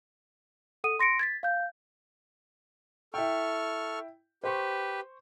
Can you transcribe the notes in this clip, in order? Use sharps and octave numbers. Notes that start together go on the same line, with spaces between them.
A4 F#5 D#6 D#7
C6 A#6 C#7 D7
G#6 A6 B6
F5 G6
E4 A4 G5 C#6 F6
G4 B4 C5 C#6